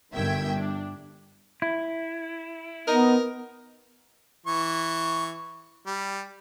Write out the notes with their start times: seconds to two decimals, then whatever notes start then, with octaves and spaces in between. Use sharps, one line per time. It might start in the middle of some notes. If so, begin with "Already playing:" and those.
0.12 G1 G2 D#3 E5 G5 G#6
0.53 D4
1.62 E4
2.88 B3 D#4 A#4
4.46 E3 C#6
5.86 G3